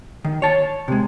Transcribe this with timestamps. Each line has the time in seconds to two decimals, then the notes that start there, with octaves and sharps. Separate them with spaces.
0.25 D#3
0.42 C#5 A5
0.88 C3 G#3